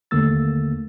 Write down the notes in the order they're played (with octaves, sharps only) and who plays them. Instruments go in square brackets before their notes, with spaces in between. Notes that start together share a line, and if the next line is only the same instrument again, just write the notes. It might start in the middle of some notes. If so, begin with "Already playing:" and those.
[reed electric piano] D#2 D3 A3 A#3 E6 A6